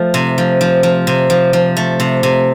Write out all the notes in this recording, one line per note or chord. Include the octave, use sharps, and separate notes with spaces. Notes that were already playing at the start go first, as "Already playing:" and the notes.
Already playing: F3 A3
C3
F3
F3
F3
C3
F3
F3
A3
C3
C3